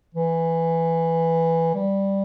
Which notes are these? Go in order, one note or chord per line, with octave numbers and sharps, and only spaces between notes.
E3
G3